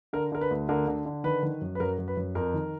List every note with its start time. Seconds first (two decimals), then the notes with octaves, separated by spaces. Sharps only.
0.13 D3 A#4
0.32 D3 A#4
0.41 B4
0.51 D2
0.69 D3 A#4
0.88 D3
1.06 D3
1.24 D#3 B4
1.43 D#3
1.61 F#2
1.75 B4
1.80 F#2 A#4
1.98 F#2
2.08 B4
2.17 F#2
2.35 F2 A#4
2.54 D#3